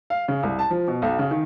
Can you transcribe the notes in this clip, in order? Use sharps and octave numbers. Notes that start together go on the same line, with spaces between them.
F5
C#3
C2
A5
F3
B2
B1
C#3
D#3